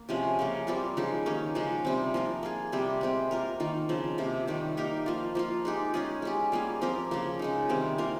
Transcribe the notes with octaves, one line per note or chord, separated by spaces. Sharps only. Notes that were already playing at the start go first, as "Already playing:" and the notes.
Already playing: A#3
C3 F3 G#3 C#4
C#3 F3 A#3
G3 C4 F4 A#4
C#3 F3 G#3 D#4
D#3 A#3 C#4 G4
C#3 F3 G#3 D#4
C3 G3 C4
F3 A#3 F4 A#4
A#3 F4 G#4
C3 G3 C4
G#3 C4 G4
A#3 F4 A#4
D#3 A#3 F4
C#3 F3 C4
C3 F3 A#3
C3 D#3 G3
A#3 D#4 G4 A#4
F3 A#3 F4
F3 A#3 F4
G#3 D#4 G4
G#3 C#4 F4 G#4
G#3 C#4 G4
G3 A#3 F4 G#4
F3 C4 G4 A#4
C#3 F3 A#3 F4
C#3 G#3 D#4
C3 D#3 G3 C4
A#3 F4 A#4